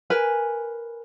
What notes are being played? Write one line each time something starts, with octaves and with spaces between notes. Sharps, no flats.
A#4 B4 G#5